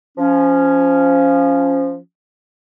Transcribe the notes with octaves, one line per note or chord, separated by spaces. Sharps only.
F3 C#4